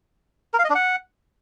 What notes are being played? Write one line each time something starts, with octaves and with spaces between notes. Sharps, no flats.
A#4
F5
D#5
D4
F#5